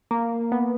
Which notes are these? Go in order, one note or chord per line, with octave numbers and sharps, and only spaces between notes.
A#3
B3